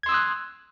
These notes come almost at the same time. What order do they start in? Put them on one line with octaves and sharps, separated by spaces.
G#6 C6 E6 D#6 F#6